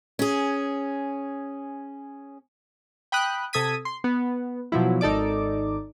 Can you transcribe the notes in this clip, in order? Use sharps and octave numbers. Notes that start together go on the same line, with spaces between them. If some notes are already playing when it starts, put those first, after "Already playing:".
C#4 G#4
G5 B5 D#6 F#6
C3 A4 D#6 G#6 B6 D#7
C6
B3
B2 F3 F#3 E4
G#1 D#4 A4 D5 D6